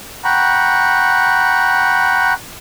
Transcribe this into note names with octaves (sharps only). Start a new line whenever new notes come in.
F#5 G5 A#5 B5 C#6